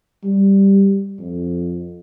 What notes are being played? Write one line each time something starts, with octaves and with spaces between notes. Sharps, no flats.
G3
F2